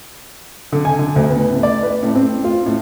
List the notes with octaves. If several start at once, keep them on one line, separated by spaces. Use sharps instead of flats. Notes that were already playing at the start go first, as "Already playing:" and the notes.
D3
G#5
D3
D2
B3
A2
D5
B4
A2
C4
F4
A2